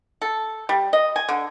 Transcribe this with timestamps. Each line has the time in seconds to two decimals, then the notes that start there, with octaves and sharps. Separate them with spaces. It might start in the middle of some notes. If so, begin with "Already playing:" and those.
0.22 A4
0.69 G3
0.93 D#5
1.16 G#5
1.29 D3